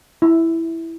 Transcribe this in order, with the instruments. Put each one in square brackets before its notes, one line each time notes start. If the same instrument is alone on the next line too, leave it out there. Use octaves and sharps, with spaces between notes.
[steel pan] E4